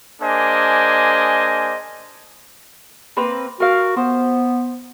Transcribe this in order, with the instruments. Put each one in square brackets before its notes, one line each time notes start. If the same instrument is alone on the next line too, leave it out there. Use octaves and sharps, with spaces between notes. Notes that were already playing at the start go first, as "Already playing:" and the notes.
[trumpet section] A#3 D4 G#4 C5 D#5 G#5
[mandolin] A#3 C4 B4
[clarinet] F#4 [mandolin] A#4 F5
[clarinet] B3 [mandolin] C5